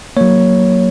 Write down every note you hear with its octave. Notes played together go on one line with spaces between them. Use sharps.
F#3 A#3 C#5